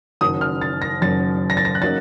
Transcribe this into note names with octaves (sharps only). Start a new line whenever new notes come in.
F#1 F#2 D#3 F#3 D#6
F6
A6
A#6
F#1 F#2 D#3 F#3 A6
A#6
A6
A#6
F#6
C#3 F#3 A#3 D#4 A6